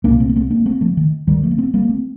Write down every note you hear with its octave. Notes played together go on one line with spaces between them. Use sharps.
C2 A#2 A#3 D4
A3 C4
A#3
A3 C4
A#3 D4
A3 C4
F3 A3
D#3
D2 D3 D#3 G3
F3 A3
A#3
A3 C4
G3 A#3
A3 C4